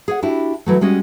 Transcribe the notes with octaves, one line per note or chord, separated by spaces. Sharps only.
G#4 C#5 F#5
D4 E4 F#4 G4
E3 F#3 A3
G3 G#3 C#4 F#4 D#5